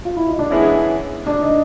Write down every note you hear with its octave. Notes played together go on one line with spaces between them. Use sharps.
F4
E4
D#4
D4
E3 G#3 B3 C#4 E4 G#4
D4
D#4